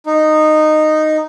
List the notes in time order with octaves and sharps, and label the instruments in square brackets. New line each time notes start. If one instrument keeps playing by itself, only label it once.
[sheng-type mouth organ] D#4